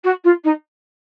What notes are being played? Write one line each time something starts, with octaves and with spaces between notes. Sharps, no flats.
F#4
F4
D#4